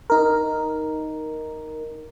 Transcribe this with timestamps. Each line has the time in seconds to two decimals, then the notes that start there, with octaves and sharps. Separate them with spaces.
0.10 D#4 A#4